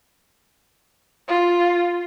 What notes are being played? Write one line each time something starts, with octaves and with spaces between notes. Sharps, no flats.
F4